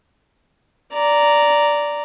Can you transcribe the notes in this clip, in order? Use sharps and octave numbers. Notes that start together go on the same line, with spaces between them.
D5 A#5